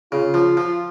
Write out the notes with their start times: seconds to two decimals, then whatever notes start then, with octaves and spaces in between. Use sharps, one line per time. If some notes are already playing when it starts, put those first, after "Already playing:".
0.12 C#3 F4
0.34 F3
0.57 F3